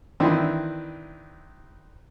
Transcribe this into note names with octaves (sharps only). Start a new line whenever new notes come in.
D#3 E3 C4 D4 E4